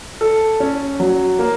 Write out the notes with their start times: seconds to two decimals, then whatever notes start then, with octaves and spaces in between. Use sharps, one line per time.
0.21 A4
0.60 C#4
1.00 F#3
1.39 A#3